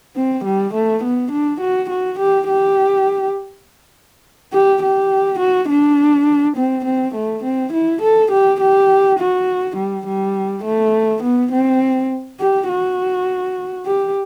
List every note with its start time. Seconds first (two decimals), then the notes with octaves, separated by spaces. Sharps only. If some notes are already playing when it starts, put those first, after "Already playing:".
0.16 C4
0.45 G3
0.74 A3
1.03 B3
1.31 D4
1.61 F#4
1.90 F#4
2.19 G4
2.49 G4
4.53 G4
4.82 G4
5.39 F#4
5.69 D4
6.57 C4
6.85 C4
7.15 A3
7.44 C4
7.73 E4
8.02 A4
8.32 G4
8.60 G4
9.19 F#4
9.77 G3
10.06 G3
10.65 A3
11.23 B3
11.52 C4
12.40 G4
12.69 F#4
13.86 G4